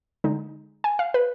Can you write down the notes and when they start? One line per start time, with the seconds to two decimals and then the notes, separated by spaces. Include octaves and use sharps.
0.24 D3 G#3 D#4
0.84 G#5
0.99 F5
1.14 B4